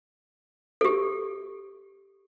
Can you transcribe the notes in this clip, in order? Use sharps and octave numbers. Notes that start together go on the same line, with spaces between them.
G4 A4